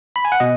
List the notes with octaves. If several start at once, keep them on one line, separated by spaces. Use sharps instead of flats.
B5
G#5
F#5
B2 D#5